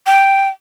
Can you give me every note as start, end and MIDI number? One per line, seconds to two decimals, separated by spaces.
0.07 0.49 79